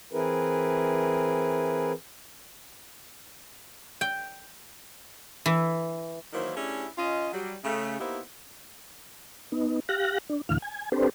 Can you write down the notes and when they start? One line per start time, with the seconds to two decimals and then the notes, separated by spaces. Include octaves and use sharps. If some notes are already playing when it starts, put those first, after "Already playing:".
0.13 E3 C4 E4 G#4 A#4 B4
4.01 G5
5.46 E3
6.32 D#3 E3 F#3 A#3 E4 C5
6.56 A3 C#4 D4 E4 G4 G#4
6.97 C#4 F4 D#5
7.32 F#3 G3
7.64 C#3 A3
7.99 A#3 B3 D#4 E4 G4 C5
9.52 B3 D#4
9.89 G4 F5 F#6 A#6
10.29 D4
10.49 D2 A2 D3 E3 F5 F6
10.62 G#5
10.92 C4 D4 G4 A4 B4 C5